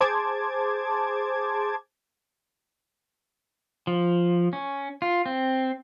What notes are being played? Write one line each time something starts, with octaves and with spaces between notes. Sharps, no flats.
G#4 C5 A5 D6 G#6
F3
C#4
F4
C4